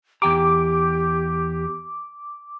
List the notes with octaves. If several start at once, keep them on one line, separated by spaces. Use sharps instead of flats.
E2 G4 G5 A#5 D6